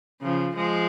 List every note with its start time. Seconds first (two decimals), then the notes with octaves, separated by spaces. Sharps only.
0.22 C#3 F3
0.56 F3 G#3